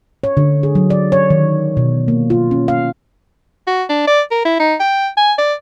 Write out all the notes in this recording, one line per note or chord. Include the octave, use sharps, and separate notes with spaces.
C#5
D3
G#4
F#3
D5
C#5
D#3
B2
A#3
F4
C#4
F5
F#4
D4
D5
A#4
E4
D#4
G5
G#5
D5